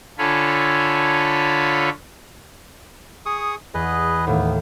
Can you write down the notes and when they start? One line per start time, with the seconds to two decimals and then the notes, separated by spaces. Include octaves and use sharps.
0.18 D3 F4 A4 C#5 G#5 B5
3.26 G#4 C#6 D#6
3.74 E2 G#4 B4 D#5
4.27 D#2 A2 B3